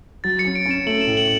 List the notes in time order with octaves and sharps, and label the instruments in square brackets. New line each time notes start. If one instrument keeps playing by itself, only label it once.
[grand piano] F#3 [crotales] A6
[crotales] C#7
[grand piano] C#4
[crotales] D7
[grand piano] C#4
[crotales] E7
[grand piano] A3 [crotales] F#7
[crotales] E7
[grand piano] A2
[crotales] F#7